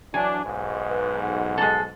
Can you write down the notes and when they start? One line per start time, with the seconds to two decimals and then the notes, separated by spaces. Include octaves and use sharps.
0.14 E3 F#3 D4 G#5
0.44 B1 G#2
0.88 B4
1.22 F#5
1.58 G#3 A4